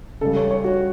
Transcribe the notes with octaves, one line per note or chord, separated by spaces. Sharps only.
C#3 G3 A4
C#5
C#5
F#4